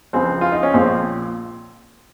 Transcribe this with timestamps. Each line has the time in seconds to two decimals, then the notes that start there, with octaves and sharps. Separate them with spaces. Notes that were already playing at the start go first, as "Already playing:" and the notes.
0.13 C#2 C#3 F3 C4
0.41 F4
0.52 D#4
0.63 C#4
0.74 A#1 A#2 F3 G#3 C4